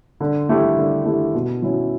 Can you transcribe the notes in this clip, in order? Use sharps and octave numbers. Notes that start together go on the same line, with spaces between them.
D3
A3 E4 G4
D3
A3 E4 G4
B2
F#3 C#4 E4